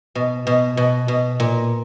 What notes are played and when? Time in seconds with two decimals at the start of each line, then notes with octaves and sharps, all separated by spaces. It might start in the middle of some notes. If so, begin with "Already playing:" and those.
0.15 B2
0.47 B2
0.77 B2
1.08 B2
1.40 A#2